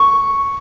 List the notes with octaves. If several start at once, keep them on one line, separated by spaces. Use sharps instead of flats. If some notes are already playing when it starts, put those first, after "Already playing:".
Already playing: C#6